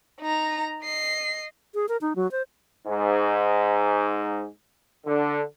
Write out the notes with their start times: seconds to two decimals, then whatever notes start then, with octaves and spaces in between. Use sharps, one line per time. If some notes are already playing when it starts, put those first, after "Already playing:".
0.21 D#4 A#5
0.82 D#5 C7
1.74 G#4
1.89 A#4
2.01 D#4
2.16 F#3
2.32 C5
2.86 G#2
5.05 D3